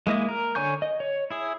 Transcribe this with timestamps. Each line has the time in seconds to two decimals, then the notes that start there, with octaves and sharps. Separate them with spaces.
0.07 G#3 A#3 E4 D#5
0.29 A#4
0.55 D3 C#5 G#5 C#6 G6
0.82 D#5
1.00 C#5
1.31 E4 G#4